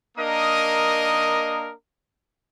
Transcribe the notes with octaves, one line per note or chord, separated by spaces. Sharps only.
A#3 D4 A#4 D#5 D#6